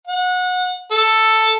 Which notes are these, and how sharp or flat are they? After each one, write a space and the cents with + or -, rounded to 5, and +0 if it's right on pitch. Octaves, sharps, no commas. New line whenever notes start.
F#5 -25
A4 +5